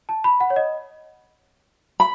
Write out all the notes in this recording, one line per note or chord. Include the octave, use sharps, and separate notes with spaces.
A5
B5
F#5
C#5
D#5
B5